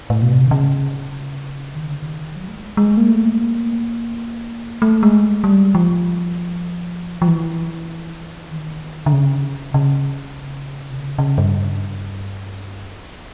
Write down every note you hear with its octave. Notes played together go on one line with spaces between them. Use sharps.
A2
B2
C3
D3
C#3
D#3
D3
D#3
F#3
A3
G#3
G#3
A#3
A3
A#3
A3
G#3
G3
F3
F3
E3
D#3
D3
C#3
C#3
C3
C#3
C#3
G2